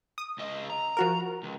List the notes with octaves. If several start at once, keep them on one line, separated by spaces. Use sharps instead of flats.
D#6
C#2 D#5
A#5
F3 F#4 A#4
C#2